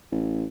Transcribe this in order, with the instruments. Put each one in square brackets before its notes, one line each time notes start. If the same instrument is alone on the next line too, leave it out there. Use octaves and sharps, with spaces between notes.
[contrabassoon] A1